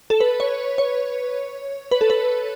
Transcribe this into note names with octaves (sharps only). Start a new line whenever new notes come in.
A4
B4
C#5
C#5
B4
A4
B4